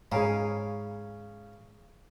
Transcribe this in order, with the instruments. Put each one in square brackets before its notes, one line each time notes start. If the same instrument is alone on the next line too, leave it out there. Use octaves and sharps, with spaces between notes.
[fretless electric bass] G#2 [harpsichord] C#3 [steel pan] G#4 C#5 F5 [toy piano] G#5 A#5 B5